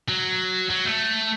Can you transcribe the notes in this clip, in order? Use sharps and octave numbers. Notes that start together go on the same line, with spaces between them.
F#3
F#3
A3